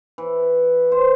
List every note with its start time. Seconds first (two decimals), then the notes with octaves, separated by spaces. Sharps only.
0.18 E3
0.92 C5